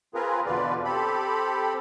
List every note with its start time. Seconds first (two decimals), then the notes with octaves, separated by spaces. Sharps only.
0.15 C4 F4 G#4 A#4 B4
0.46 E2 B2 D3 F4 B4 D5
0.84 C4 G4 A4 B5